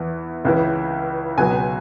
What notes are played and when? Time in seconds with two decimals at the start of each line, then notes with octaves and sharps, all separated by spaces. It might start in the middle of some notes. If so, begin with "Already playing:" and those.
Already playing: E2 E3
0.45 C#2 C#3 E3
1.38 C#2 B2 F#3 G#5